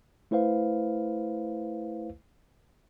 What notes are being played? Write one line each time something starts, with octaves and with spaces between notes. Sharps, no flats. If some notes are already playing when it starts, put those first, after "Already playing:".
A3 E4 B4 C5 F5